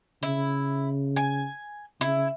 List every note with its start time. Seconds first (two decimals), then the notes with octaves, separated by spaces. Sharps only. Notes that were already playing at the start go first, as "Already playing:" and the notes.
0.23 C#3 E4
1.16 G#5
2.01 C#3 E4